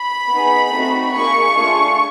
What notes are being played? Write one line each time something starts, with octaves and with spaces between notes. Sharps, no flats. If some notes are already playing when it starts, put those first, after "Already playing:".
Already playing: B5
B3 D#4 G#4
A3 C4 D#4 F#4
A#3 D#4 G#4 C#6
A3 D4 F4 G#4